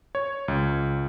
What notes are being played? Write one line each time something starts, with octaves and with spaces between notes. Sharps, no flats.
C#5
C#2